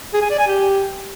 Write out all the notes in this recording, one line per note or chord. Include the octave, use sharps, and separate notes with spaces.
G#4
G#5
D5
G#5
G4